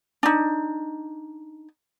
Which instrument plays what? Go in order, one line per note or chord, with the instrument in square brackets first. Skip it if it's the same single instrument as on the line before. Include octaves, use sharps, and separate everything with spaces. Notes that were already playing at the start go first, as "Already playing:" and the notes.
[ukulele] D4 D#4